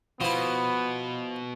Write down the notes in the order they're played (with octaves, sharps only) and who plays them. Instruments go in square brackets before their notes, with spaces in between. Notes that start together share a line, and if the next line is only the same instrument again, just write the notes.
[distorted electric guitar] B2 [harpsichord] F3 E4 [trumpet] B3